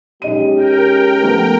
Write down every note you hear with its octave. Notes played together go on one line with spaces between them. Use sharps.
B1 G#3 C#4 G4 D#5 D#7
A#4 G5
F3 A3 B3